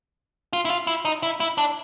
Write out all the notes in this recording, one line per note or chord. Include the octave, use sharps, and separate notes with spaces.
F4
E4
F4
E4
D#4
E4
E4
D4